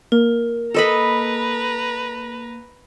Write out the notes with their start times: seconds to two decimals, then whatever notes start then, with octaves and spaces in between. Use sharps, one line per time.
0.12 A#3 A#4
0.74 A4 B4 D#5 A#5 B5